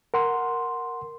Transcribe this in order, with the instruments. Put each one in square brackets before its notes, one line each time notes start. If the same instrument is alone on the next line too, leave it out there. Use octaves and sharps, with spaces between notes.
[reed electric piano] A#4 F#5 C6